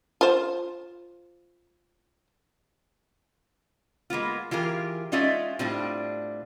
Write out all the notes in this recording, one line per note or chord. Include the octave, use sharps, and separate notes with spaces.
F4 C5
G#3 A#3 B3 F4
E3 F4 G4 G#4 A#4
G#3 C#4 D#4 F4 D5 E5
A2 G3 C4 D4 F4